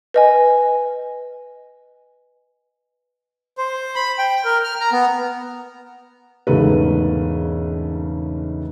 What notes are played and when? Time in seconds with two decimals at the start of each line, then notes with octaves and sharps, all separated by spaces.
0.14 B4 D#5 G#5
3.58 C5
3.96 B5
4.18 G5
4.45 A#4
4.64 F6
4.80 A#5
4.92 B3
6.47 E1 G#2 C#3 A3 B4